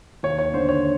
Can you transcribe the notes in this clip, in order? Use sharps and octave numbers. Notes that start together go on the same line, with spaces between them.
D#2 C#5
C#5
D3 C5
C#5